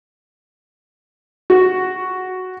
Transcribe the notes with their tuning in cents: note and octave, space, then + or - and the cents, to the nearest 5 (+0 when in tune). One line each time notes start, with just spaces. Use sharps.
F#4 +0